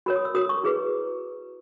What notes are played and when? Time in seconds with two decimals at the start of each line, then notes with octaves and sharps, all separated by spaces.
0.06 F#4 A#4 C#5 B5
0.16 D#6
0.25 E6
0.34 F#4 A#4 C#5 D#6
0.49 C#6
0.63 E4 G#4 B4